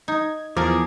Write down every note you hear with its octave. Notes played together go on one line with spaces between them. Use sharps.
D#4 G#6
E2 F3 G#4 A#4 D6 G#6